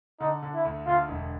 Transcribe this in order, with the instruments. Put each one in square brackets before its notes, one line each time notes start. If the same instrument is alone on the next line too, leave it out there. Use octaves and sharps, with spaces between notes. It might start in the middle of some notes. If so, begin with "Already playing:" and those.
[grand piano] D3 [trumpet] D#4
[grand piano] D3
[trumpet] E4
[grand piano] D2
[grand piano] D3 [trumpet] F4
[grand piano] E1